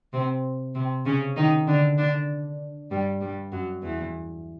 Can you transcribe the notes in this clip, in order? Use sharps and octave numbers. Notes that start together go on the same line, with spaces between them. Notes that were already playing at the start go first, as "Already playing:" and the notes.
C3 C4
C3 C4
C#3 C#4
D#3 D#4
D3 D4
D3 D4
G2 G3
G2 G3
F#2 F#3
E2 E3